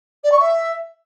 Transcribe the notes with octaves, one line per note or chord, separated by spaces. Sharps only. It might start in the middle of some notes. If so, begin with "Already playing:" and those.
D5
C#6
E5